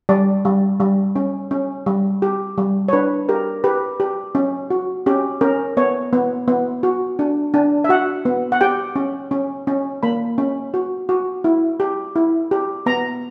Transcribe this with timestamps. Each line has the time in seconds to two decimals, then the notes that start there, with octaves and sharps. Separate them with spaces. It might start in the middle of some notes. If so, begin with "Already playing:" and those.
0.09 G3 D5
0.45 G3
0.80 G3
1.16 C#4
1.51 C#4
1.86 G3
2.22 G4
2.58 G3
2.88 C#5
2.93 D4 B4
3.29 G4 A#4
3.64 G4 B4
4.00 G4
4.35 C#4
4.70 F#4
5.06 C#4 G4
5.41 C#4 A#4
5.77 B3 C#5
6.13 B3
6.48 B3
6.83 F#4
7.19 D4
7.54 D4
7.84 E5
7.89 F#4 F#5
8.25 B3
8.52 F#5
8.61 G4 G5
8.96 C#4
9.31 C#4
9.67 C#4
10.03 A#3 B5
10.38 C#4
10.74 F#4
11.09 F#4
11.44 E4
11.80 G4
12.16 E4
12.51 G4
12.86 B3 A#5